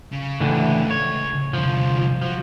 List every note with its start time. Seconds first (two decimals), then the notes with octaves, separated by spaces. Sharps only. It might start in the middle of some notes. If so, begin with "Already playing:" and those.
0.12 C#3
0.40 C#2 A2 D3 E3
0.91 C#5
1.53 C2 D3 F3
2.22 F3 F#3